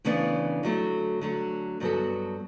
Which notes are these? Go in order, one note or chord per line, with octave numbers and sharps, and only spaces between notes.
D2 C#3 E3 B3 D4
D3 F#3 A3
D3 F#3 A3
G2 F#3 B3 F#4 A4